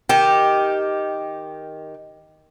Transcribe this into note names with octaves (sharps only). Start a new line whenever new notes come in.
D#3 G4